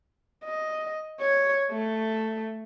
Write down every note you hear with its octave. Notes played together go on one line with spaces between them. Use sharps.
D#5
C#5
A3